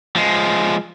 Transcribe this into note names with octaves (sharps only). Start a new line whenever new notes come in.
F3 G#3